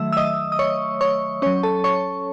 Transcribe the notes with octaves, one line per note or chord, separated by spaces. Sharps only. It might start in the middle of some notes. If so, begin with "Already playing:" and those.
Already playing: D#3 F#3 A3 E5 E6
E6
D#5 D#6
D#6
C#5 C#6
C#5 C#6
F#3 C#4 C#5 C#6
A4 A5
C#5 C#6